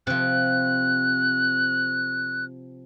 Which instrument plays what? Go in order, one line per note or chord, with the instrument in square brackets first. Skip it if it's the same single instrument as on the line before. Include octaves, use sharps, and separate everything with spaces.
[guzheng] C3 F3 [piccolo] F#6